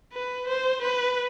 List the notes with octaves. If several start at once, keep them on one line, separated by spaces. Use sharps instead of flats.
B4
C5
B4